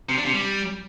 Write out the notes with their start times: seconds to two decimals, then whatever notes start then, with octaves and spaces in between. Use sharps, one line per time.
0.09 C3
0.17 D4
0.25 C3
0.33 G3